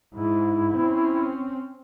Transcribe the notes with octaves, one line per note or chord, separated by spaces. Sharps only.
G#2 E4
C4 C#4